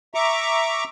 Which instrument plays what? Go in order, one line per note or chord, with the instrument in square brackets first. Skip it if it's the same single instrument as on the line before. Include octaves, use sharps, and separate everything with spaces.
[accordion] E5 A#5 C#6 D6